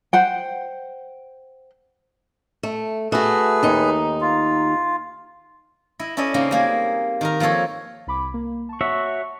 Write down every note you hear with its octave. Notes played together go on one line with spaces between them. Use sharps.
C5 F#5 G5
A3
A3 F#4 G#4 B4
D#2 D#4
F4
E4 D#5
C#4 E4 A4 D5 D#5
C#3 A#3 C4 D#4
G3 A#3 G#4
D#3 D#4 A#4
F3 A#3 C4 A4 C#5
C2 B5 D6
A#3
A5 C#6
F#4 C#5 E5